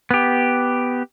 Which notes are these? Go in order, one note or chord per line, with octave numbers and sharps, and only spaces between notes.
B3 G4